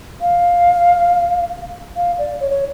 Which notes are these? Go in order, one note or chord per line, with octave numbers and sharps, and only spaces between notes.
F5
F5
D5
C#5
C#5